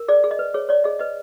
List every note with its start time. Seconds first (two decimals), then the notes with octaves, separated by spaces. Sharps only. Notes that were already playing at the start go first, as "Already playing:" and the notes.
Already playing: A#4
0.08 G#4 D5
0.24 G#4
0.31 D#5
0.39 B4
0.54 G#4 C#5
0.69 C#5 D5
0.84 G#4 D#5
0.99 B4 D#5